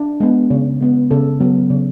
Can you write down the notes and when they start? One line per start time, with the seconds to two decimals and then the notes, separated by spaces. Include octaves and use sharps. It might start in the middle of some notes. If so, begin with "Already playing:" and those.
Already playing: D4
0.20 G#3 B3
0.50 C#3
0.81 G#3 B3
1.11 C#3 A4
1.40 F#3 B3
1.70 C#3